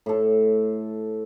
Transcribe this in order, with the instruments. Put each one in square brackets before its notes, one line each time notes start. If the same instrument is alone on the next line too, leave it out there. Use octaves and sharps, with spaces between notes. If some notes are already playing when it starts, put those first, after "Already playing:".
[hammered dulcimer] A2 A4